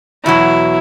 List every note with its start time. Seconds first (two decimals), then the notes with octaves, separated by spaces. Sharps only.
0.25 E2 B2 F#3 E4